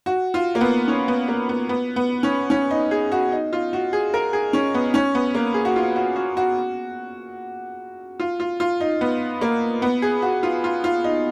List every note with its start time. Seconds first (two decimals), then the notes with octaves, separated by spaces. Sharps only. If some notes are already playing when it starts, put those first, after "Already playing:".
0.06 F#4
0.34 F4
0.55 A#3
0.61 B3
0.88 C#4
1.08 B3
1.28 A#3
1.49 B3
1.69 B3
1.96 B3
2.23 C#4
2.50 C#4
2.71 D#4
2.91 G#4
3.12 F#4
3.32 D#4
3.53 F4
3.73 F#4
3.93 G#4
4.14 A#4
4.33 G#4
4.53 C#4
4.74 B3
4.94 C#4
5.15 B3
5.34 A#3
5.54 G#4
5.65 F#4
5.76 F4
5.96 F#4
6.16 F#4
6.37 F#4
8.20 F4
8.40 F4
8.60 F4
8.80 D#4
9.01 B3
9.41 A#3
9.82 B3
10.02 G#4
10.22 F#4
10.43 F4
10.64 F4
10.84 F4
11.04 D#4